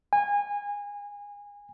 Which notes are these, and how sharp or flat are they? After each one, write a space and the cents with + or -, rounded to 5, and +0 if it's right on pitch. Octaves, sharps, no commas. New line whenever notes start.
G#5 -25